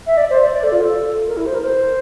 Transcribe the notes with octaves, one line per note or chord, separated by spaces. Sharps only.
E5
D5
C5
D5
D5
A4
F4
A4
A#4
E4
C5
A#4
C5